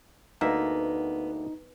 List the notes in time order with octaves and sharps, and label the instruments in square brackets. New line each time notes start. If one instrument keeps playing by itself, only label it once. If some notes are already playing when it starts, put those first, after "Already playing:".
[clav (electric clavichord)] D2 A#3 E5 [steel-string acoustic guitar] B3 [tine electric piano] D#4